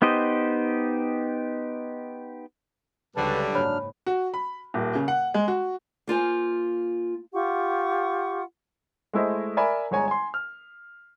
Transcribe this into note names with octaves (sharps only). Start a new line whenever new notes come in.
B3 D#4 G4 C5 D#5
C#2 G2 D3 F#3 G3 B4 A5
F#1 G#2 F#3 D4 C#5 B5 F6
F#4
B5
D#1
C#3
F#5
G#3
F#4
A#3 F4 C5 G#5
F4 G4 F#5 C#6
G#3 A3 E4 C5 D#5
A#4 D5 E5 G#5 B5
G1 G#3 C#5 G#5 A#5
G#5 C6
F6